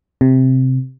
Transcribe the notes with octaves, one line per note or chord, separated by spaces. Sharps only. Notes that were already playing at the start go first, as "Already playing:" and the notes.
C3